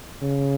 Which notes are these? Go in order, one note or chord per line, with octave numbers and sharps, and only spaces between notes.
C#3